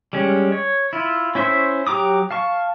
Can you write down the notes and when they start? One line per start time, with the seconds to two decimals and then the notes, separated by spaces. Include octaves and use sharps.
0.13 G3 G#3 C#4
0.52 C#5
0.93 E4 F4
1.35 C#4 E4 C5 E5 C#6
1.87 F#3 G4 A#5 D6 D#6
2.31 F5 A5 C#6